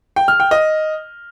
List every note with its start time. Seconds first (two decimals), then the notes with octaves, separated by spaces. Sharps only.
0.16 G5
0.28 F6
0.40 G5
0.51 D#5